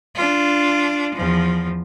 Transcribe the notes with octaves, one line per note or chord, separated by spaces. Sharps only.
D4 F4
E2 F3